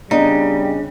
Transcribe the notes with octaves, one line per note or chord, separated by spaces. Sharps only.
C#3 G3 B3 D4 D#4